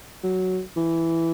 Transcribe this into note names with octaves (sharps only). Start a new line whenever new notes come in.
F#3
E3